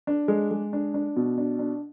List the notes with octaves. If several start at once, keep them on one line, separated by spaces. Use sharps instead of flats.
D4
G#3
G#3
D4
D4
B2
D4
D4